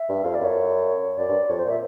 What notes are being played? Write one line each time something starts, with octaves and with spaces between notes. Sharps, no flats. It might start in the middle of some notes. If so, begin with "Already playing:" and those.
Already playing: E5
G2
F2 F5
D5
F#2 C#5
F#2 D5
G2
F2 C#5
C5
A#2 E5